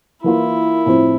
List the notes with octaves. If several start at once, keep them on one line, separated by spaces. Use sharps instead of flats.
E3 A#3 E4 F4
A2 F3 C4